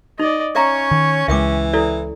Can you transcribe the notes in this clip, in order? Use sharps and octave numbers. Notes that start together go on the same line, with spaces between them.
D#4 D5 D#5
C#4 C#5 E5 A#5
D#3
C#2 E3 G#3 E5 G5 D6
E4 A4 D5